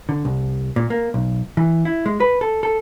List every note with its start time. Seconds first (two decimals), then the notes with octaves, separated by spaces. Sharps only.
0.09 D3
0.25 C2
0.76 A#2
0.90 A#3
1.14 B1
1.57 E3
1.85 E4
2.06 G#3
2.20 B4
2.41 A4
2.63 A4